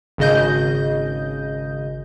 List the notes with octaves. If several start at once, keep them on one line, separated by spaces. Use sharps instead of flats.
G#1 C#3 D#5 G6